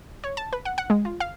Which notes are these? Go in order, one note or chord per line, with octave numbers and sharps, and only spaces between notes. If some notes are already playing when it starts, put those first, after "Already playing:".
C#5
A5
B4
F#5
F#5
G#3
F4
F5